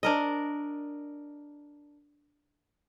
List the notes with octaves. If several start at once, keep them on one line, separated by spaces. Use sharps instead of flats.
D4 A#4 D#5